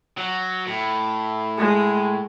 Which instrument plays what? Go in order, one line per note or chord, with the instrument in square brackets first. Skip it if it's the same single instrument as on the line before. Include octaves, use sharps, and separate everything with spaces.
[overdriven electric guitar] F#3
A2
[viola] G#3